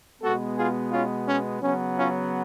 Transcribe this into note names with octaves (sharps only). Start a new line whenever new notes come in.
B2 G#3 B3 F#4 A4
F4 G#4
C#4 F4
C#4
C#3 F#3 B3 C#4
C#4 F4